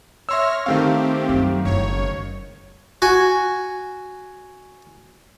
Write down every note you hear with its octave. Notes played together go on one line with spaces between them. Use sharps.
C#5 E5 C6 E6 F6 A#6
D#3 A3 C4 G4 F5
F#2
F#1 C#5
F#4 G#5